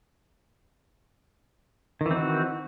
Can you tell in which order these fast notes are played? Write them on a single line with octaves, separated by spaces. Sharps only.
D#3 E3 C4 F#4